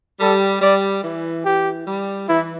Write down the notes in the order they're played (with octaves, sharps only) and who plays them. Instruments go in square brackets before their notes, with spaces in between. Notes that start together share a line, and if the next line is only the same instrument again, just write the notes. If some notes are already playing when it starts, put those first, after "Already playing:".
[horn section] G3 [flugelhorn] A4
[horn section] G3 [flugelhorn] D5
[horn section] E3
[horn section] E3 [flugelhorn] G4
[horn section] G3
[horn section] E3 [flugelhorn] E4